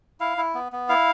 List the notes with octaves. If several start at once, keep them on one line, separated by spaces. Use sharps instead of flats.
E4 F5
E4
B3
B3
E4 F5